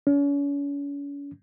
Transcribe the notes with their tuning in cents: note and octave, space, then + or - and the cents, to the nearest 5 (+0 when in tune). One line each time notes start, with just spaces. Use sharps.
C#4 +40